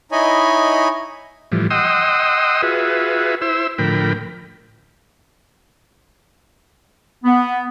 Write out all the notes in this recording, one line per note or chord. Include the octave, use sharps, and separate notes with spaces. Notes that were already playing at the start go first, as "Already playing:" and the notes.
D#4 E4 C#5 D#5 G#5 B5
A2 E3 F3 G3
D#5 F#5 G5 C6 D#6 E6
F4 F#4 G#4 B4 E5
E4 C5 E6
A2 D3 F3 A#4 G5 B5
B3